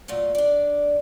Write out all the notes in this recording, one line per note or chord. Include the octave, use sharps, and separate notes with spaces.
A#2 F#3 A3 A#3
D4 D5